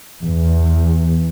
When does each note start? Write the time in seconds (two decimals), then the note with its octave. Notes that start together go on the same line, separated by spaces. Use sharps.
0.24 E2